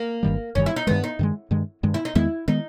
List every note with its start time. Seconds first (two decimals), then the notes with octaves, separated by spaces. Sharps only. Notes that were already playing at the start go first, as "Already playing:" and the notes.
Already playing: A#3
0.23 G1 G2 D#3 G3
0.55 G1 G2 D#3 G3 C#4
0.66 E4
0.76 D#4
0.87 G2 D#3 G#3 B3
1.04 D#4
1.19 G2 D#3 G#3
1.51 G2 D#3 G#3
1.83 G2 D#3 G#3
1.94 E4
2.05 D#4
2.15 E2 D#3 G#3 B3 E4
2.48 D#3 G#3 B3 D#4